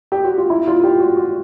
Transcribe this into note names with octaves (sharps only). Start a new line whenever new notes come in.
G4
F#4
F4
E4
F4
G4
F#4
F#4